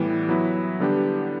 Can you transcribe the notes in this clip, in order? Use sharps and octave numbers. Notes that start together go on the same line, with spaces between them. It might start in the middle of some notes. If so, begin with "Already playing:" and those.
Already playing: A2 E3 G3 B3
F#3 B3 E4
D3 G3 B3 D4 G4